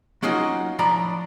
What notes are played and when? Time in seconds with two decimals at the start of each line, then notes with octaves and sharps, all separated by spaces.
0.22 F#3 A#3 C#4 D#4 F4 F#4
0.79 A2 D3 F3 D5 A#5 B5